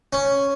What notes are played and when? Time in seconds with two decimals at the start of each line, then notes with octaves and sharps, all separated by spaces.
0.13 C#4